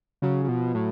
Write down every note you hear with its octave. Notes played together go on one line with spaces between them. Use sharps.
C#3 F#3
F#3
B2 F3
A2 F#3